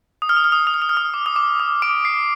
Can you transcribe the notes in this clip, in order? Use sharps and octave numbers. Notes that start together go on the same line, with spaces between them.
D#6
F6
D#6
F6
D#6
F6
D#6
F6
D#6
F6
D#6
D6
D#6
D6
D#6
D6 D7
C7